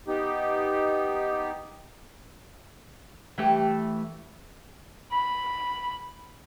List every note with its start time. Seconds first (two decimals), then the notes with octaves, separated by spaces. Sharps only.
0.07 B3 D#4 G4
3.38 E3 A3 G4
5.12 B5